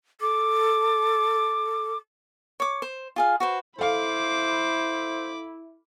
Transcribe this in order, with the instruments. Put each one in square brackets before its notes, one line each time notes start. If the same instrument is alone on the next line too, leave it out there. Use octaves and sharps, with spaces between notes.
[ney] A4 [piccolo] D6
[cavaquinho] C#5 D6
C5
F4 G#4 F5
F#4 B4 C5
[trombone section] E4 [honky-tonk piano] A4 F5 [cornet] C5 [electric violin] B5 D6